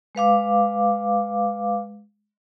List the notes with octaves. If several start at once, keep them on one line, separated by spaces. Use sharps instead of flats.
G#3 B4 F5 D6